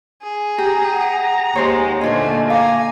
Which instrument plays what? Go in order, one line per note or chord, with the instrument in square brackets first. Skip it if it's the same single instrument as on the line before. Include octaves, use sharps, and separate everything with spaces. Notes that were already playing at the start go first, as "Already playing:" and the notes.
[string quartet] G#4
[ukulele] G4 [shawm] A#5
[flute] F#5
[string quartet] D#2 G#3 [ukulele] G4 C5 C#5
[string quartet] A#2 D3 A3 [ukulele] D4 F4 C5 [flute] D#5 [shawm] G#5
[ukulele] F5 [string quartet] G#5 [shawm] A#5 [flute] D6